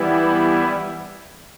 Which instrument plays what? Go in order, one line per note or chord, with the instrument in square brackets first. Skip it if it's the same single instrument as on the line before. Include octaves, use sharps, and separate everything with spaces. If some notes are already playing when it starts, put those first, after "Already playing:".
Already playing: [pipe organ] E3 G3 B3 E4